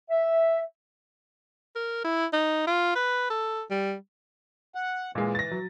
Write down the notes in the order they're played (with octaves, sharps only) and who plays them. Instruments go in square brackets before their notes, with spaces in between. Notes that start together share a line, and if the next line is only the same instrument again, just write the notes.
[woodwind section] E5
[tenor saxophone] A#4
E4
D#4
F4
B4
A4
G3
[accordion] F#5
[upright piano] A#2 G#3 [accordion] E3
[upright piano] A6 A#6
F#3